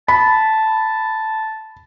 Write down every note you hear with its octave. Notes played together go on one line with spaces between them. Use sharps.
A5 B5